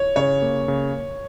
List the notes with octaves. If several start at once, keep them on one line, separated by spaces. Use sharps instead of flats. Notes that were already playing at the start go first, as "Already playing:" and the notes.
Already playing: C#5
C#3 C#5
A#3
C#3